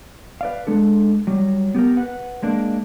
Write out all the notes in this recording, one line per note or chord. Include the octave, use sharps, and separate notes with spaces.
B4 D5 F5
G#3 D4 A4
F#3 G3
B3 G4 G#4 A#4
B4 F#5
G#3 A#3 D4